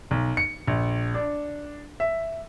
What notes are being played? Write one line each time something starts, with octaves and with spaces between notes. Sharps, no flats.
B1
C#7
A#1
D4
E5